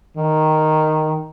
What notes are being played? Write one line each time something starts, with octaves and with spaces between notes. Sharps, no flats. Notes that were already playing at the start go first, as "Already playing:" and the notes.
D#3